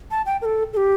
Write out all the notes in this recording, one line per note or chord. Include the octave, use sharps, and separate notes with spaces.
A5
G5
A#4
A4
A4
G4